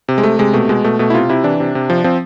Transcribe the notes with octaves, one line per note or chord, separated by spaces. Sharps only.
C3
G#3
C3 A3
C3 G#3
B2 A3
B2 G#3
B2 A3
B2 A3
E4
C3 F4
C3 E4
E3 D4
C3
C3
F3
F3 C4